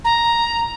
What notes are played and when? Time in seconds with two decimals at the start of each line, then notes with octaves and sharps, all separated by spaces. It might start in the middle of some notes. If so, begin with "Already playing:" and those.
0.05 A#5